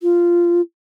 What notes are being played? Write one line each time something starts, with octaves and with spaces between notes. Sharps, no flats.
F4